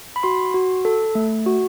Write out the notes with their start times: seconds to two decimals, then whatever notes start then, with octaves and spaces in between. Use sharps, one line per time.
0.16 B5
0.23 F#4 C6
0.54 F#4
0.85 A4
1.15 A3
1.46 F#4